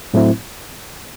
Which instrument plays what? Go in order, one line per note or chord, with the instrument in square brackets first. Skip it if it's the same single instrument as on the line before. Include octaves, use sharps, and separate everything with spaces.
[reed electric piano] A2 F#3 A3 C4 E4